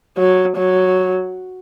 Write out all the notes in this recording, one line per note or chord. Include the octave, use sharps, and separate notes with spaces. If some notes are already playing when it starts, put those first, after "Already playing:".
F#3
F#3